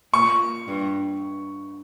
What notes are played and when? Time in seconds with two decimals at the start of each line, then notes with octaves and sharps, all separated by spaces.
0.13 A#2 C#6
0.67 G2